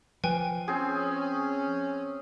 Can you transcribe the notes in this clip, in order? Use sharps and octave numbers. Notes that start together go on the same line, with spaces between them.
F3 B4 G5 G#5
C4 C#4 G#4